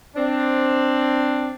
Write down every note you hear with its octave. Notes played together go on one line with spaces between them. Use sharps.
C4 D4